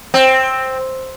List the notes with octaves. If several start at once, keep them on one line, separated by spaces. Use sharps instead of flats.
C4